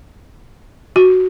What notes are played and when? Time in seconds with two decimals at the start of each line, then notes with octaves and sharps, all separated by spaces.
0.96 F#4